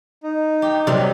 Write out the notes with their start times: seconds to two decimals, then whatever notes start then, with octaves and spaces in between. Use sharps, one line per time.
0.23 D#4
0.62 G4
0.87 C3 F#3 G3